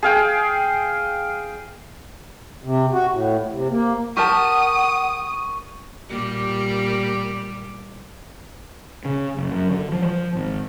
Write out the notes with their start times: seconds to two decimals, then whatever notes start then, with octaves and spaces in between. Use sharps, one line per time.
0.03 G#4 F5 G5
2.64 C3
2.93 F#4
3.11 A2
3.51 C3
3.70 A#3
4.17 G4 A#4 F#5 A5 C#6 D#6
6.10 A#2 G3 G4
9.05 C#3
9.37 F#1
9.50 F#2
9.70 D3
9.92 F3
10.05 F3
10.35 G#1